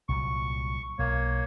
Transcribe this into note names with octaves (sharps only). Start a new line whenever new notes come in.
C2 A#2 F#3 C#6
B1 A#3 C#5